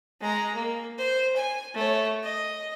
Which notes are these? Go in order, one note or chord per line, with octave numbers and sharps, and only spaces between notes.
G#3 A#5
A#3
C5
G#5
A3 C#5
D#5